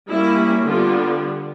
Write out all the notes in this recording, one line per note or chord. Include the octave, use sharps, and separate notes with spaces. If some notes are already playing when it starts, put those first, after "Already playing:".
G3 A#3 C#4 E4
D3 G3 B3 F4